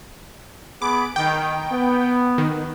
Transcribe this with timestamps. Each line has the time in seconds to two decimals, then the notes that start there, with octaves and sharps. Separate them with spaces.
0.82 B3 G#4 B5 D6
1.16 D#3 G5
1.71 B3
2.38 D#3